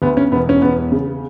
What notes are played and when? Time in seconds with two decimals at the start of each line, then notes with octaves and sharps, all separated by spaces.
0.02 D2 B3
0.17 C#4
0.32 E1 B3
0.49 C#4
0.61 E1 B3
0.92 C#3